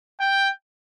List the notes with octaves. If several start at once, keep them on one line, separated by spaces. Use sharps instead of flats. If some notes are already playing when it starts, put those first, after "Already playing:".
G5